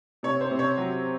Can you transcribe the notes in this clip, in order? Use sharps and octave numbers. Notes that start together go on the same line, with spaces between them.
C3 C#5
C5
C3
C#5
F#3